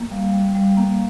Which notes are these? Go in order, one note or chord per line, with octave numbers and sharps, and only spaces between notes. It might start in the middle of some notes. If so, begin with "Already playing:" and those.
Already playing: A#3
G3 F5
G3
G3
A#3